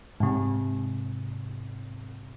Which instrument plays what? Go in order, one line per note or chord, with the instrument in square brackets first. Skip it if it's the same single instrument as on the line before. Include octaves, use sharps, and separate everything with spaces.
[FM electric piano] G#2 C3